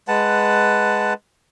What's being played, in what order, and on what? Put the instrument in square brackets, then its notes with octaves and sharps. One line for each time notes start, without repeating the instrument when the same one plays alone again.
[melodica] G#3 B4 F#5 A5